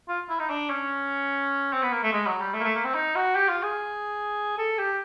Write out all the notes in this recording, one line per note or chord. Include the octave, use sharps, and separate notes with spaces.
F4
E4
D#4
D4
C#4
C4
B3
A#3
A3
G#3
F#3
G3
A3
A#3
A3
A#3
C4
D#4
F#4
G4
F4
G#4
A4
G4